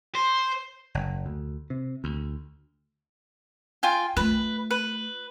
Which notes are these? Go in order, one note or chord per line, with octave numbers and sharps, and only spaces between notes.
C5
F#1
D2
C3
D2
F4 G5 G#5
A3 F4 B4
B4